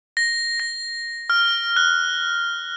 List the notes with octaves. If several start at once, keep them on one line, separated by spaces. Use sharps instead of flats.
A#6
A#6
F6
F#6